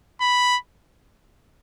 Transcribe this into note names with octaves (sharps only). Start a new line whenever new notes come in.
B5